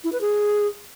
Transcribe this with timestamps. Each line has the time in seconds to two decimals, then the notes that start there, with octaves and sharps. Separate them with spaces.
0.04 E4
0.13 B4
0.21 G#4